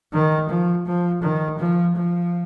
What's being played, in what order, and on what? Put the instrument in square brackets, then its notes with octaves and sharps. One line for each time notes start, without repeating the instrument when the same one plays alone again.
[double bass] D#3
F3
F3
D#3
F3
F3